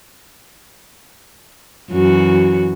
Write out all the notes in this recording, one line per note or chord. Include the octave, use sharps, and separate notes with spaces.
F#2 E3 F#4